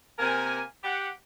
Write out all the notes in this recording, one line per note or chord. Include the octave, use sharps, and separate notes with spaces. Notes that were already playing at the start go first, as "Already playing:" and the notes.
C3 A#3 A#4 G#5
G4 F#5